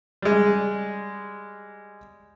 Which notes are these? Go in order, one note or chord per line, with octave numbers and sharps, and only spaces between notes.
G3 G#3